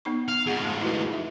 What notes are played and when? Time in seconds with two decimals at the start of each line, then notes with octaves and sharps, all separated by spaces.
0.05 B3 D#4 C#6
0.28 F5
0.46 F2 G#2 G#4 F#5
0.65 A3
0.81 E4 F#4 B4
1.10 D#4 E5